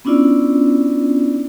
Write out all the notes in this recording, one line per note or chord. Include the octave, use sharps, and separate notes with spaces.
B3 C#4 D4 E4 F4 D5